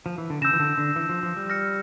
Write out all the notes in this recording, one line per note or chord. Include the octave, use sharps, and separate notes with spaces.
F3
E3
D3
C#3 E6 G6 A#6 E7
E3
D3
D3
E3
F3
F3
G3
F6 A#6 C#7